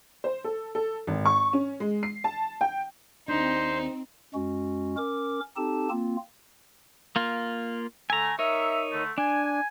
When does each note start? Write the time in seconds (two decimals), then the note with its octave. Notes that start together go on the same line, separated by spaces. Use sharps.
0.24 C5
0.44 A4
0.75 A4
1.07 G#1
1.25 C#6
1.53 C#4
1.80 G#3
2.03 C7
2.24 A5
2.61 G5
3.28 D#2 C4 D4 D#4 C5
4.34 F#2 G#3 C#4 F#4
4.97 C#4 A#4 D6
5.56 C4 D#4 G4 A4 A5
5.90 A#3 C4 F4
7.16 A#3 F4
8.10 D3 A3 G#5 A#5
8.39 D#4 A#4 C#5 E5
8.92 D3 A3
9.18 D4 G#5